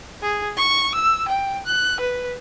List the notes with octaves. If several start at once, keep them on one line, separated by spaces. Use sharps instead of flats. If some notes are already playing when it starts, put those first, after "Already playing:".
G#4
C#6
E6
G5
F#6
B4